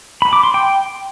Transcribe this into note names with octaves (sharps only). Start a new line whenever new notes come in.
B5
D6
C6
G5